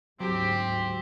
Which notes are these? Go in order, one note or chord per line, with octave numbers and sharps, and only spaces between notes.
D2 G#2 F#3 G#3 C4 G4